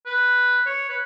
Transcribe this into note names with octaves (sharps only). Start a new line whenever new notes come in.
B4
C#5
B4